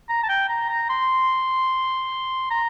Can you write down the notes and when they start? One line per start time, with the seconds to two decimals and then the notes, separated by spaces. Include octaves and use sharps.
0.09 A#5
0.24 A5
0.29 G5
0.49 A#5
0.69 A#5
0.90 C6
2.51 A#5